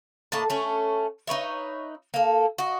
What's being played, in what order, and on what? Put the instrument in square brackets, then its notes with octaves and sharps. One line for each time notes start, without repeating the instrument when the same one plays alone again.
[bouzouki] A2 A#3 D#5 A5
A3 C#4
D#4 B4 C#5 E5
A#3 A4
F#4 D#5